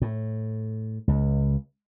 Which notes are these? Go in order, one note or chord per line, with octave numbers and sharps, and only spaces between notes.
A2
C#2